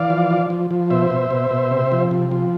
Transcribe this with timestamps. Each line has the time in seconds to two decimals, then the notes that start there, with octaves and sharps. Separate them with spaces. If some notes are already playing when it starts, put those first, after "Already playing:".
Already playing: E3 D5 F5
0.10 F3
0.31 F3
0.50 F3
0.71 F3
0.90 B2 C5 E5
1.10 B2
1.31 B2
1.51 B2
1.71 C3
1.92 F3
2.11 C3
2.31 F3